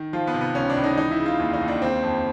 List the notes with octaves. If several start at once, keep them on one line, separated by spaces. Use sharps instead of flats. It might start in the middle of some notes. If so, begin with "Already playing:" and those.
Already playing: D#3
F3 F4
B3
C3
B3
C#2 C#4
D4
C#2
D#4
E3 D#4
E4
C#3
F4
D#2
D#4
D#2
D4
C#3 C4
F2